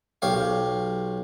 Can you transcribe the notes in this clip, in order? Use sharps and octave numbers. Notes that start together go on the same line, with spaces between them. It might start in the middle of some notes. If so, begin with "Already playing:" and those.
B1 G4 C#5 F5